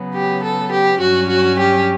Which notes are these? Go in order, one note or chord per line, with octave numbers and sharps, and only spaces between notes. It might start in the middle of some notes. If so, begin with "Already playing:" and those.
Already playing: C#3 F#3 B3
G4
A4
G4
G2 F#3 C#4 F#4
F#4
G4